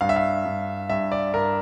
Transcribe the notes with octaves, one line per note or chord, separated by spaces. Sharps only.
G2 F5
E5
F5
G2
G2 E5
D5
G2 A#4